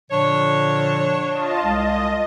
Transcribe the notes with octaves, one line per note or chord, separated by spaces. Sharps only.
A#2 D3 F3 D4 C#5
F4 D#5 A5
C2 G#3 D#5